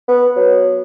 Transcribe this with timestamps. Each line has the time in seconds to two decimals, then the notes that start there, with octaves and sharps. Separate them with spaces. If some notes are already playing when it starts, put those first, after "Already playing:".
0.08 B3
0.36 F#3